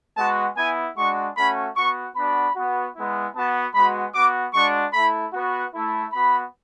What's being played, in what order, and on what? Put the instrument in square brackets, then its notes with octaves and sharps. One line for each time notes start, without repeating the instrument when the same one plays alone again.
[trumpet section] G#3 B3 F#4 A5
B3 E4 G#5
G#3 D4 F#4 C#6
A3 C#4 F#4 B5
B3 F#4 C#6
B3 D4 F#4 B5
B3 F#4
G#3 B3 E4
B3 F#4 A5
G#3 B3 F#4 B5
B3 F#4 D6
G#3 D4 F#4 C#6
A3 E4 B5
B3 F#4
A3 E4
B3 F#4 B5